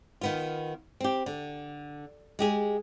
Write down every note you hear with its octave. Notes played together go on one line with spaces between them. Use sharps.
D#3 B3 F4
C4 G4
D3
G#3 G4 G#4